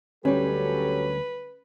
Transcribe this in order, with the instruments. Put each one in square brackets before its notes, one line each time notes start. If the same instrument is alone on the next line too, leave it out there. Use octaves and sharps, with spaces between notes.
[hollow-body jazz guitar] D2 G3 [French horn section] F#3 G4 A4 [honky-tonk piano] C#4 [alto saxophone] B4